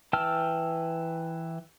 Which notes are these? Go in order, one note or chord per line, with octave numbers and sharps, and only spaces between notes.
E3 G5 A5 E6 F6